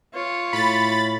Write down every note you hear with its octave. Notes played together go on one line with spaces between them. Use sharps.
F4 C#5
A2 B5 A6